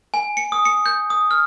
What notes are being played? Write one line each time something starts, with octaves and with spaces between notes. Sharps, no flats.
G#5
C#7
D#6
C#7
G6
D#6
F6